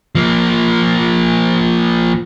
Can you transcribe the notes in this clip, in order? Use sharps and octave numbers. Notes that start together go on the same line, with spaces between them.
F3 A#3